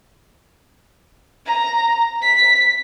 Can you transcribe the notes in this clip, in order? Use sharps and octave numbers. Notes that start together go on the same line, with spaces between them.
A#5
B6